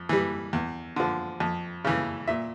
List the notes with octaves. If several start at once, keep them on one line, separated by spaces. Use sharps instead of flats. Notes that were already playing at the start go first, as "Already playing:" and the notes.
Already playing: F2
E3 G3
E2
D3 F3
F2
C#3 E3
A#2 E5